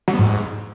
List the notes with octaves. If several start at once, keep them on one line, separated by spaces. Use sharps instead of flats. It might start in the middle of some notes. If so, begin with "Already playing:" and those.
F#3
B3
G#2